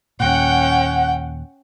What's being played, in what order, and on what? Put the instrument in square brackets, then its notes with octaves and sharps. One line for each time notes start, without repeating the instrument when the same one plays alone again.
[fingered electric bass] D#2 A#2 [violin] C#4 G5 [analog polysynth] F#5